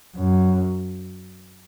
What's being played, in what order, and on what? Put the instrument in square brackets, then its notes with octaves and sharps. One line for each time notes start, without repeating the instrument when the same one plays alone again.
[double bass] F#2